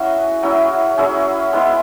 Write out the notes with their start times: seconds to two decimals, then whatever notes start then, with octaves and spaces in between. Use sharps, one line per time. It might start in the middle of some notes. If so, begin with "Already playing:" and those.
Already playing: F#3 C#4 E4 F#4 G#4 F#5
0.43 F#3 C#4 E4
0.98 F#3 C#4 E4 G#4
1.53 G#3 B3 E4